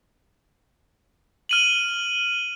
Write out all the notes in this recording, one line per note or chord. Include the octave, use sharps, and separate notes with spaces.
F6 D#7 F#7